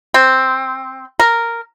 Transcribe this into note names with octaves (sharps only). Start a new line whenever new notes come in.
C4
A#4